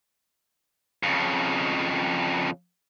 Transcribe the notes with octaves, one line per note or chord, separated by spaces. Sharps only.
F2 C#3